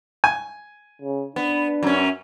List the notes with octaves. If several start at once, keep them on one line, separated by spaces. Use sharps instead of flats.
G#5
C#3
B3 D4
F#2 C#4